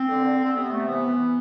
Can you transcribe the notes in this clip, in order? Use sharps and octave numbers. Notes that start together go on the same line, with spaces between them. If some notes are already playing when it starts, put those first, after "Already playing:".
Already playing: C4
D3
D3
D3 C4
C3 B3
C3 A3
E3 B3
E3